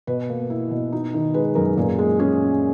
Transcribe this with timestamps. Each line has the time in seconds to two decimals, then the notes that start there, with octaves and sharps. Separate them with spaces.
0.07 B2 B4
0.29 A#3
0.50 E4
0.71 B2
0.92 D#4
1.14 D#3
1.34 G#3 B4
1.55 F#2 A#4
1.77 A#2 G#4
1.99 G#3
2.19 C#4 G#4